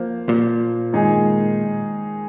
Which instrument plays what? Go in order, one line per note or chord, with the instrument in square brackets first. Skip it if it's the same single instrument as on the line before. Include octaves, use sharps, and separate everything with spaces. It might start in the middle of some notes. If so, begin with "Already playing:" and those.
Already playing: [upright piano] F3 A#3 F4 C5
[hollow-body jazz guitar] A#2
[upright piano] D#3 G#3 D#4 G#4